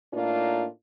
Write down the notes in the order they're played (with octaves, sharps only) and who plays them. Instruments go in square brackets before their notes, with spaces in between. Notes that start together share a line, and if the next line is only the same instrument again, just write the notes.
[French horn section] A2 A#3 D4 D#4 F4